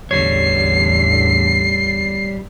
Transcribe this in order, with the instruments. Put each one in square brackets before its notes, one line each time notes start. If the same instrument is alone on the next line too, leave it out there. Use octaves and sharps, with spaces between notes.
[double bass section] A1 E2 D3 [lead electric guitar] G3 C#5 [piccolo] C7